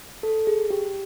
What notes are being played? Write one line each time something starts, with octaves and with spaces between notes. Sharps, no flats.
A4
G#4
G4